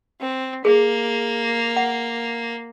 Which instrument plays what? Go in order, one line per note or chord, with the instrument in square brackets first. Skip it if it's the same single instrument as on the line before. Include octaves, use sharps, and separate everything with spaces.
[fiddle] C4
[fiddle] A#3 [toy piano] G#4
[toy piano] F#5